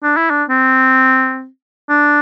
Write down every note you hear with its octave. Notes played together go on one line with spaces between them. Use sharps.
D4
E4
D4
C4
D4